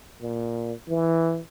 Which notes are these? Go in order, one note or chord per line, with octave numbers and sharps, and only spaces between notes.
A#2
E3